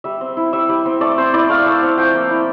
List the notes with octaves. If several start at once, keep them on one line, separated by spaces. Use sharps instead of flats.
G3 E5
C4
E4
G3 E5
G3
C4
A3 D5
C4 C5
E4 D5
A3 F5
A3
C4
F3 G5
A#3
E4